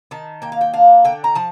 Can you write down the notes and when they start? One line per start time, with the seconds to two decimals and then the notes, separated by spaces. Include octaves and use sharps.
0.11 D#3 A5
0.42 A#3 G5
0.52 F5
0.61 G5
0.74 D4 F5
1.04 D3 G5
1.24 A#5
1.35 F3 A5